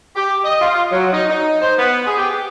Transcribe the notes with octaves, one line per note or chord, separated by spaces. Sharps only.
G4
D#5
F4
F#3
D#4
D#4
C5
B3
G#4
G4